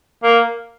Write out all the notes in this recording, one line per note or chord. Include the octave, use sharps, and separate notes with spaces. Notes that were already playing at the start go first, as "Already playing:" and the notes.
A#3